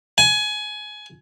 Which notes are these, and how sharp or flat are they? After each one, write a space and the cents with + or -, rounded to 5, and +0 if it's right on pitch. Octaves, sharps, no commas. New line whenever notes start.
G#5 +20